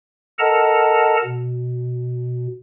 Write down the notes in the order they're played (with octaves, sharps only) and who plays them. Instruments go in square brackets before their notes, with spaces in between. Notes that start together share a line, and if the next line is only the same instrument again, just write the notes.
[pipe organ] A4 A#4 D#5 F#5 A5 A#5
B2